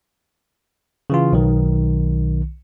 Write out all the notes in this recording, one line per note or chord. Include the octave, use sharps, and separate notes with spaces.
C#3 E3 F4
B1 D#3